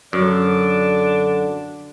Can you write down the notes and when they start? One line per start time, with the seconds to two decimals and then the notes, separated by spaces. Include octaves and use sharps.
0.13 F#2 D3 D4